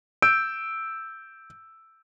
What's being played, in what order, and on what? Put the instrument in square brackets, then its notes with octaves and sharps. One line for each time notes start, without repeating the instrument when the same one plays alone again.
[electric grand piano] E6 G6 D7